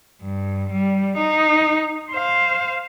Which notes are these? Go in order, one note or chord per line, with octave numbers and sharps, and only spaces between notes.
G2
G3
D#4
C5 F5